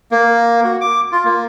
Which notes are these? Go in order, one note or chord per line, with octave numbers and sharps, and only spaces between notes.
A#3
F#4
D6
F4
A#3